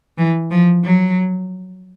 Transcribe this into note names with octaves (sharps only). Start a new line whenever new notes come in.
E3
F3
F#3